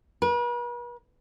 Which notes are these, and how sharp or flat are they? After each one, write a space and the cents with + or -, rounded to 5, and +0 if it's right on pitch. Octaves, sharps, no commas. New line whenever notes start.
B4 -45